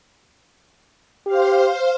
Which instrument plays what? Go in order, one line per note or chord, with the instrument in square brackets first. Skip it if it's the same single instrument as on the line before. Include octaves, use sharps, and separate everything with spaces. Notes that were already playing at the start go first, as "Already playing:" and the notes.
[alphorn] G4 [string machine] C5 F5